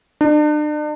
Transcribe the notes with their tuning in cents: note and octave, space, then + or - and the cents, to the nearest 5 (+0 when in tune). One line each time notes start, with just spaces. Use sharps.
D4 +40